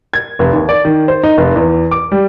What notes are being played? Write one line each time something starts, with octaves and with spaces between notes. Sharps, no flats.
G#6
F1
D#2
D5
D#3
C5
D#4
F1
E2
D6
G3